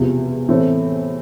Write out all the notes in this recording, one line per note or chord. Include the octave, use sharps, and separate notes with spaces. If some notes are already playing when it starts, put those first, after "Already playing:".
Already playing: E1 E2 C3 F3
A2 E3 A3 C4